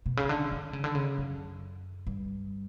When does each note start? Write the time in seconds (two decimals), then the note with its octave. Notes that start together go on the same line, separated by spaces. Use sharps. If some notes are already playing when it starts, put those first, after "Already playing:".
0.06 B2
0.17 C#3
0.29 D3
0.51 D3
0.73 C#3
0.84 D3
0.95 C#3
1.18 F#2
2.07 G2